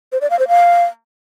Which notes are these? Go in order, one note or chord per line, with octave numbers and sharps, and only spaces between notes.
C5
D5
F5
C5
F5